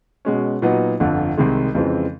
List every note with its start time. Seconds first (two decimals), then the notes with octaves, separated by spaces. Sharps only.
0.25 B2 G#3 C#4
0.62 A#2 F#3 B3 D#4
1.00 G1 F2 D3
1.37 C2 C3 D#3 G#3
1.75 F2 C#3 E3 G#3 C4